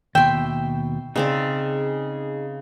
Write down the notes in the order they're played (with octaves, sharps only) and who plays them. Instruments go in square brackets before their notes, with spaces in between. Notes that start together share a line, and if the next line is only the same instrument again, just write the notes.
[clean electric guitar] D#2 B2 [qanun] E5 C6 [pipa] G5
[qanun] C#3 C4 D5 [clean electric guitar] D#4 G#4